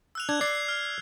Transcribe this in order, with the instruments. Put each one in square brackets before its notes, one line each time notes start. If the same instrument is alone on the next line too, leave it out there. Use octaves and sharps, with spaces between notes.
[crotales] E6 F#6 F7
[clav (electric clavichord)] D4 [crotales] F#6 G#6
[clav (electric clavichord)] D5 [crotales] C7
[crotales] F6